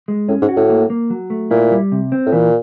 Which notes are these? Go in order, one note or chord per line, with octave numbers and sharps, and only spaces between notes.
G#3
A2 C#4
G#2
F#4
A2
A#3
A#3
F#3
A3
A#2 E4
G3
C3
C4
A2
A#2 E3